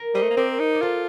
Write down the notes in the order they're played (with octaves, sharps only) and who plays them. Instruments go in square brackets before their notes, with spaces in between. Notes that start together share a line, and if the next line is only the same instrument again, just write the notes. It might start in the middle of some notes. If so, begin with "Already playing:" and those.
Already playing: [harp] A#4
[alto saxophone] G3 [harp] C5 D#5
[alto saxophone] A3
A#3
[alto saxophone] C4 [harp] A#4 D5
[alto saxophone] D#4
[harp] D5
[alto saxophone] F4 [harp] A4 C5